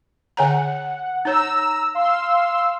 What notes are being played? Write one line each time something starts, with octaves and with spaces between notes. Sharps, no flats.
D3 C#5 F#5 A#5
D#4 C#5 A#5 E6
F5 C6 E6